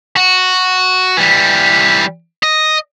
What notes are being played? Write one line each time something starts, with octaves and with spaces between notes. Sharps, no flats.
F#4
E3 G3
D#5